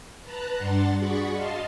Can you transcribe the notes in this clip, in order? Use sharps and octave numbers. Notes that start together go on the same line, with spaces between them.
B4 A5 A#5 F#6
G2 D4 F#5 C6 A6
F#4 G#4 D5 B5 C#6
D#5 F5 A5 C6